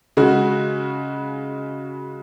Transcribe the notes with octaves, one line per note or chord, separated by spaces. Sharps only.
C#3 G#3 F#4